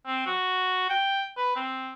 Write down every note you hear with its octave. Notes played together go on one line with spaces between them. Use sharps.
C4
F#4
G5
B4
C4